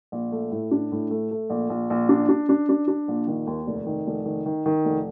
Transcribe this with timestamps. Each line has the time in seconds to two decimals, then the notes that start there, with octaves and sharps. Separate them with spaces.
0.12 A#1
0.32 A3
0.51 A2
0.71 D4
0.92 A2
1.11 A3
1.31 A3
1.50 A#1
1.70 A#1
1.90 A#1
2.09 D4
2.29 D4
2.49 D4
2.69 D4
2.88 D4
3.08 A#1
3.27 D#3
3.47 D#2
3.67 F1
3.87 D#3
4.07 F1
4.26 D#3
4.46 D#3
4.66 D#3
4.85 F1